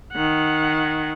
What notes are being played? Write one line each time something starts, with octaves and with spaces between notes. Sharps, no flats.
D#3 F#5